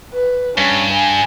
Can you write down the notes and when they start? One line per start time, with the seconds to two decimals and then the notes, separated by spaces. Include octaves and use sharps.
0.14 B4
0.58 G2 C#4
0.93 G#5